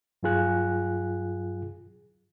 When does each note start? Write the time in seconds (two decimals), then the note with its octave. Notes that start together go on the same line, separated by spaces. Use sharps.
0.23 G2 F#3 F4 G#4 F#6